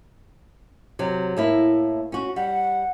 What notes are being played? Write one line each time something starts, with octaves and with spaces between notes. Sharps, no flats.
C3 F#3
A2 A#3 E4
C#4 F#4
G3 F#5